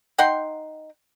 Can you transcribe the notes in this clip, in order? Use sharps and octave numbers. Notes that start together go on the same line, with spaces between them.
D#4 F#5 G5 C6